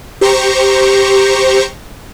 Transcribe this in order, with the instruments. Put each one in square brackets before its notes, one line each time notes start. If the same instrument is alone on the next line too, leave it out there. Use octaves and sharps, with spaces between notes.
[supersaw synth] G4 C5 A#5 C#6